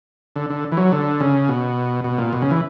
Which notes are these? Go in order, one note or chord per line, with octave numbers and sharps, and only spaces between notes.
D3
D3
E3
F#3
D3
C#3
B2
B2
A#2
B2
C#3
E3